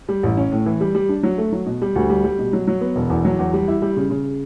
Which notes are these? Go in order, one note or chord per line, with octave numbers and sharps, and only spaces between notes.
G3
A1
C#4
A2
E3
G3
G3
D4
F#3
A3
F#3
B2
G3
D2
G3
G3
B2
F#3
F#3
B3
E1
E2
F#3
E2
G3
E4
G3
C#3
C#3